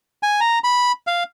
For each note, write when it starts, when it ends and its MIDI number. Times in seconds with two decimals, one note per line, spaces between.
0.23 0.40 80
0.40 0.59 82
0.64 0.92 83
1.07 1.23 77